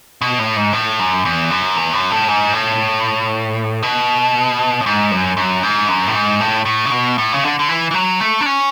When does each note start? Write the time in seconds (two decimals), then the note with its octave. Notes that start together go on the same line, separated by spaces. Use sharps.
0.21 B2
0.39 A2
0.56 G#2
0.73 A2
0.99 F#2
1.25 E2
1.50 F#2
1.77 E2
1.93 F#2
2.11 A2
2.28 G#2
2.53 A2
3.83 B2
4.81 A2
4.86 G#2
5.11 F#2
5.37 F#2
5.63 G#2
5.89 F#2
6.07 A2
6.15 G#2
6.40 A2
6.65 A2
6.86 C#3
6.91 B2
7.18 A2
7.33 C#3
7.43 D3
7.59 D3
7.69 E3
7.91 E3
7.94 F#3
8.21 A3
8.41 D4
8.46 C#4